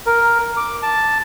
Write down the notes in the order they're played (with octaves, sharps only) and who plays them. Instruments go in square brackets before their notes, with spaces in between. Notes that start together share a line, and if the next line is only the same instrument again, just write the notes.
[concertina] A#4
D6
A5